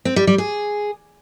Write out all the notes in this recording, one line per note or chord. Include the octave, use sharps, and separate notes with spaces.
C4
G3
G3
G#4